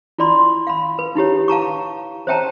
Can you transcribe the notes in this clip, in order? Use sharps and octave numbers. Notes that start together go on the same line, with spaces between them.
E4 F4 D5 B5 C6
F5 B5
B4
D#4 E4 G4 C#5
F5 A5 A#5 C#6
C5 C#5 E5 G5 A5 A#5